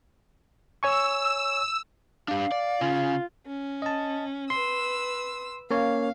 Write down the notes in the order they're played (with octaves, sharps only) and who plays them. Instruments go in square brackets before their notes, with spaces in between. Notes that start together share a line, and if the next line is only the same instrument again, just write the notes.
[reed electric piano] C#5 G#5 C#6 [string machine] E6
[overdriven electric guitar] G3 D4 [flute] F5
[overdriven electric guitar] D5
[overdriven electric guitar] C#3 C#4 [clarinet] F4
[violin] C#4
[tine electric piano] D#5 A5
[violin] B4 E6 [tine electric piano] C6
[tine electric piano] A#3 C#4 C#5 [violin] F5